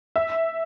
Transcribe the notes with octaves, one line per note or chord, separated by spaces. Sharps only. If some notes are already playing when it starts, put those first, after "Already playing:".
E5